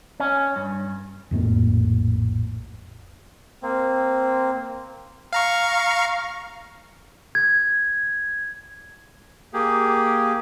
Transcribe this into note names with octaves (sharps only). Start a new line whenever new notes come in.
C#4
G2
A#1 F2 A2 A#3
A#3 C4
F5 A#5 C#6
G#6
A#3 G4 G#4